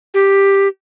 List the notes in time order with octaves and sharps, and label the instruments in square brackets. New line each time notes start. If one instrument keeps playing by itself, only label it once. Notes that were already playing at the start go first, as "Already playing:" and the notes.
[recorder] G4